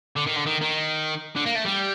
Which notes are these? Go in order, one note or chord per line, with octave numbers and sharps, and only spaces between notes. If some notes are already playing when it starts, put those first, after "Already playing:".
D3
D#3
D3
D#3
D#3
D3
A#3
A3
G3